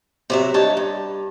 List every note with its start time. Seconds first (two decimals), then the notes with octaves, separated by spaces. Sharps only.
0.30 C3 F#3 E5
0.54 G2 D#4 C#5 A5
0.77 G2